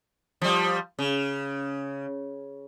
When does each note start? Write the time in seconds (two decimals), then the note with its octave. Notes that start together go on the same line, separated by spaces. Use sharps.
0.42 F3 G3
0.99 C#3